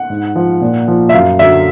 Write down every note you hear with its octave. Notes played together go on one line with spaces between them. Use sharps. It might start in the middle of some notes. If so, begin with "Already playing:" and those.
Already playing: F#5
G#2
F3
A#2
F3
E5
F#2 F5
D3 F#3 E5